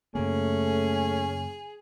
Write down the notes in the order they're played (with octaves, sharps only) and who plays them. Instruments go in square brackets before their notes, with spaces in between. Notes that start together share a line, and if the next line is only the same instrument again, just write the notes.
[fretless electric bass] F#2 C#3 A#3 [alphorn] A3 [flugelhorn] C#4 [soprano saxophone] G#4